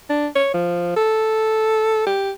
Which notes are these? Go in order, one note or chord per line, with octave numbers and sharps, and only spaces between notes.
D4
C#5
F3
A4
G4